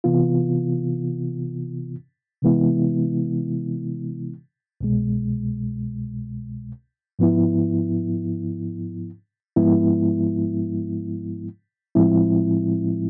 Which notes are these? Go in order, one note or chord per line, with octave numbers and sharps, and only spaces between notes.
C3 E3 B3 F4
C3 E3 G#3 B3 E4
C2 B2 G#3
G#2 F3 B3 E4
G#2 F3 G#3 B3 E4
A2 F3 G#3 C4 E4